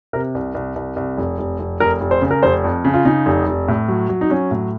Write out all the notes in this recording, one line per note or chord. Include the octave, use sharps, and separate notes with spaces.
C3 A#4
C2
C2
C2
C2
F1
F1
F1
F1 A#4
F1
C5
C#3
A#4
F1 C5
F2
C#3
F4
C#3 D#4
F1
F1
A2
F#3
F#3
D#4
F#3 C#4
A2